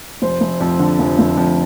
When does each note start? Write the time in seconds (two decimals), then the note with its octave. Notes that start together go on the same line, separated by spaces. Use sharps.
0.22 F1 C5
0.41 F1
0.61 F2
0.79 D3
0.99 F1
1.19 F1
1.37 F2